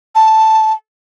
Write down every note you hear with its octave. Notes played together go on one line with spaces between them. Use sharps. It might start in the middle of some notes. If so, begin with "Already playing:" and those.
A5